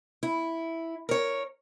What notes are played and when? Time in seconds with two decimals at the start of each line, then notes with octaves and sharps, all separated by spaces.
0.23 E4
1.09 A#4 C#5